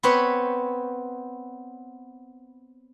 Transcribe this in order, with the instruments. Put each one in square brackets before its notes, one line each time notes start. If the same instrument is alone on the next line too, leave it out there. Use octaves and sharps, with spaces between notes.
[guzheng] B3 C4 B4 C#5 B5